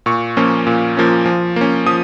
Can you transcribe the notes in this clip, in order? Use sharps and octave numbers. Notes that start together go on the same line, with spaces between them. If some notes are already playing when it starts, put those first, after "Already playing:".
A#2 C#6
F3 A#3 C#4
A#2
F3 A#3 C#4
F3
A#3 C#4
F3 D#6